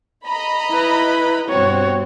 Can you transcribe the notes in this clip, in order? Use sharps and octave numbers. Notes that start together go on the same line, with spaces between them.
D#5 A#5 B5
E4 B4
G2 B2 C4 F#4 C#5